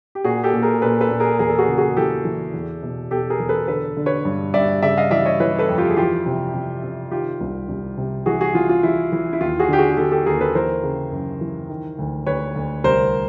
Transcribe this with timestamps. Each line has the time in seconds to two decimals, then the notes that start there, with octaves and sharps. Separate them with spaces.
0.15 G4
0.24 A#2 F#4 G#4
0.43 G4 A4
0.54 A#2
0.63 G#4 A#4
0.82 A#2 A4 B4
1.01 A4 B4
1.10 A#2
1.20 G#4 A#4
1.39 E2 G#4 A#4
1.49 A4
1.59 F#4 G#4
1.68 C#3
1.78 F#4 G#4
1.97 E3 G4 A4
2.25 E3
2.54 E2
2.83 B2
3.11 B2 G4 A4
3.30 G#4 A#4
3.40 E2
3.49 A4 B4
3.68 D3 A4 B4
3.97 D3
4.06 B4 C#5
4.25 G2
4.54 G2 D5 E5
4.82 C#3 D5 E5
4.97 D#5 F5
5.11 E3 D5 E5
5.26 C#5 D#5
5.40 E3 B4 C#5
5.59 A4 B4
5.69 F2
5.78 F4 G4
5.90 G#4
5.97 E3 F4 G4
6.26 C3
6.54 C3
6.83 C3
7.11 D#3 F4 G4
7.40 C2
7.69 C2
7.97 C3
8.26 E3 F#4 G#4
8.41 F#4 G#4
8.54 E3 F4
8.69 F4
8.83 E3 E4
9.12 E3
9.33 E4
9.41 D#2 F4
9.59 F#4 G#4
9.69 D3 G4
9.78 F#4 G#4
9.97 D3 G4 A4
10.12 G4 A4
10.26 D#2 G#4 A#4
10.41 A4 B4
10.55 E3 A#4 C5
10.83 C#3
11.12 F#2
11.41 E3
11.69 D#3
11.99 D2
12.26 D2 B4 C#5
12.56 D2
12.84 C2 A#4 C5